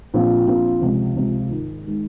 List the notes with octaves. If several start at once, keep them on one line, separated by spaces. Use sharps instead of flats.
A#1 A#2 F3 C4 F4
A#1 A#2 F3 C4 F4
C#2 C3 F3
C#2 C3 F3
G#2 D#3 G#3
D#3 G#3